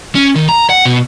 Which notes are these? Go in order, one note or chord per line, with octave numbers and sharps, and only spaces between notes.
C#4
D#3
A#5
F#5
B2